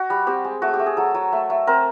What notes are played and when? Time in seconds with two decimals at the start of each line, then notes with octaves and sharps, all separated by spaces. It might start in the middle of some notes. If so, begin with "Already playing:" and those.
Already playing: F#4
0.10 G3
0.27 C4 G4
0.44 G#3
0.62 A3 F#4
0.73 G4
0.79 A3
0.86 G#4
0.97 F#3 A4
1.14 F#3
1.32 A3
1.50 A3
1.67 C4 A#4